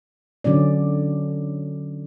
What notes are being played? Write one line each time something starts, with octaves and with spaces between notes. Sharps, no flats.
D3 F#3 C#4 D5